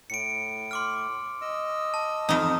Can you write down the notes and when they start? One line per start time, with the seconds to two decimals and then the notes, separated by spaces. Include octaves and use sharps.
0.10 A2 C#7 D7
0.71 C6 D6 F6
1.41 D#5 E6
1.94 A5
2.29 F2 D#4 A#5 D#6